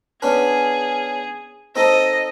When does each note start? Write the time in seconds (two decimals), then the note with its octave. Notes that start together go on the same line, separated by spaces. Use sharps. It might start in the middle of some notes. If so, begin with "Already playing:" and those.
0.22 B3 C#4 D4 G#4
1.76 C4 D#4 A4 D#5